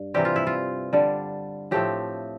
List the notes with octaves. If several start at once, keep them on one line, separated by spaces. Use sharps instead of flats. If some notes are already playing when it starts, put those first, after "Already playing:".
Already playing: G2
C3 E3 G3 C4 G4
F4
E4
F4
D3 G3 D4
A2 F3 A3 C4 G4